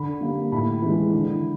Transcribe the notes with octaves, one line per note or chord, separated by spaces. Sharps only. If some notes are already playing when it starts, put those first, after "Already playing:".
Already playing: D3 B5
G3 A#3
A2 B5
E3 G#3
D3